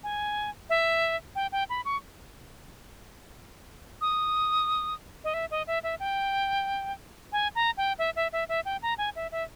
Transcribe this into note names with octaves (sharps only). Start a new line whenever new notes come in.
G#5
E5
G5
G5
B5
C#6
D#6
D#5
E5
D#5
E5
E5
G5
G#5
A#5
G5
E5
E5
E5
E5
G5
A#5
G#5
E5
E5